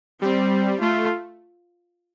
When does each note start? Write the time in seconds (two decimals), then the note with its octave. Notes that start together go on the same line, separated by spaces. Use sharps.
0.21 G3 C4
0.81 A3 F4